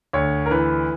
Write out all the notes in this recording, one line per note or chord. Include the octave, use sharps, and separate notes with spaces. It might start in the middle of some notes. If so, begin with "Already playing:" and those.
D2 C#5
A#4
E3 B4